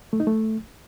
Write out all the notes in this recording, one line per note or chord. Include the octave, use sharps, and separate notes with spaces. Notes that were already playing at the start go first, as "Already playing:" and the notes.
A3
D#4
A3